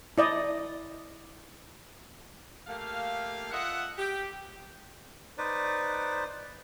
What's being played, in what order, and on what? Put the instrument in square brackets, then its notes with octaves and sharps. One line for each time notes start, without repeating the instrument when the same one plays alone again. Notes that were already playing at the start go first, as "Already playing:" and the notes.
[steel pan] E4 D5 D#5
[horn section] A3 A#3 G4 F5
F4 D#5 E5 F#5
G4
[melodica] D#4 B4 C5 D5